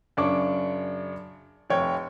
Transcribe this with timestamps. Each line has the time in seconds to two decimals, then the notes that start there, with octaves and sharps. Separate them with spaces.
0.17 F#2 C#3 D4 C#5 C#6 D6
1.70 F1 C#5 G5